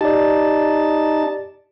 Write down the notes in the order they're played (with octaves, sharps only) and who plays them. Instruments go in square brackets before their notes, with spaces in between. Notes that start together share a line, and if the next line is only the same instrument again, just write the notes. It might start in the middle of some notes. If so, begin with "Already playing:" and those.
[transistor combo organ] D#4 A5 [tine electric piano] G4 D5